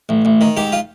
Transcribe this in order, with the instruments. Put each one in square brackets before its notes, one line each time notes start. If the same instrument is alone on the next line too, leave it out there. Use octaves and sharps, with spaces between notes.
[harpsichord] A1
A1
D#3
G#2 G4
F4